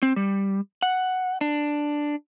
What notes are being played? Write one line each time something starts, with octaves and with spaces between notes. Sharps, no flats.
C4
G3
F#5
D4